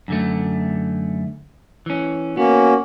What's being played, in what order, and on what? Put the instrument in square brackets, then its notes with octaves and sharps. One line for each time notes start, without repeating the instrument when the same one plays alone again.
[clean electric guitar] F#2 D3 A3
E3 C#4
[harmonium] A#3 C#4 F#4 [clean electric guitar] B3